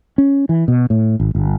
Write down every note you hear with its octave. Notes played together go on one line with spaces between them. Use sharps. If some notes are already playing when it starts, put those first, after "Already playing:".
C#4
E3
B2
A2
G#1
G1